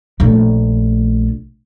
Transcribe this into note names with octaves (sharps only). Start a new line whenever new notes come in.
A#1 A3